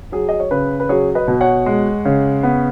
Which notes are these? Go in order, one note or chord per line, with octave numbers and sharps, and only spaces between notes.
F#3 G#4
D#5
C#5
C#3 B4
B4
F#3 G#4 C#5
B4 D#5
B2
C#5 F#5
G#3
C#3
B3